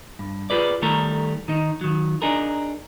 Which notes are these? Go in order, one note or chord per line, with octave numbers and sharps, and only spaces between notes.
G2
F4 G#4 B4 D5
D#3 G3 A3 A4 A#4
D#3 D#4
D#3 F#3
D4 D#4 G#4 A#4